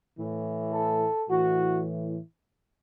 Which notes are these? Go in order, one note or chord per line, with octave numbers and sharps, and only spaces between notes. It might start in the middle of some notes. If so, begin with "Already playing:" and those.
A2 E3
A4
A2 E3 F#4